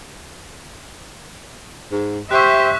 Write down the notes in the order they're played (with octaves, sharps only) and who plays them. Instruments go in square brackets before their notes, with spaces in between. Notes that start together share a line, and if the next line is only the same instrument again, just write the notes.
[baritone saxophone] G#2
[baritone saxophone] G4 [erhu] C5 [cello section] E5 [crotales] C#6 F#6